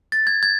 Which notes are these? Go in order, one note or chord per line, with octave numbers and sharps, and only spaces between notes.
A6
G#6
G#6